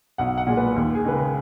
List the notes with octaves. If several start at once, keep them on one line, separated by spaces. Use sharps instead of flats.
B1 F#5
F#5
A#2 G#3
B4
D#2
G#4
C#3 G#3 B4
A#4